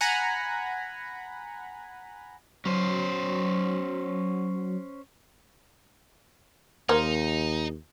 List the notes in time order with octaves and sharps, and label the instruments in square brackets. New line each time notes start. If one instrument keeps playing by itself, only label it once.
[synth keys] F#5 G#5 A#5 B5
[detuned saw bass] F#3 [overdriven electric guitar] C#4 C5
[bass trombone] D#2 [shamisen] A#3 A#4 C5 [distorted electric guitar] D#4